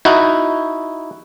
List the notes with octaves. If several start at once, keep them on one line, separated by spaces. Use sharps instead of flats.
D#4 E4 F#4